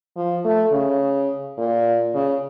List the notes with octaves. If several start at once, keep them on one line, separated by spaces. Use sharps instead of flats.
F3
A3
C#3
A#2
C#3